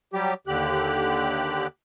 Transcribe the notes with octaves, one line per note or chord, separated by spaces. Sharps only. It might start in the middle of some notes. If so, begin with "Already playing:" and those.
F#3 G3 G4
D#2 D3 G4 F#6